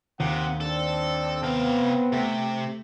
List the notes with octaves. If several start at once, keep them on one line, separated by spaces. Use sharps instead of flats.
D#2 C3 F#5
C4 D4 A4
C3 B3 F5
C3 A3 B6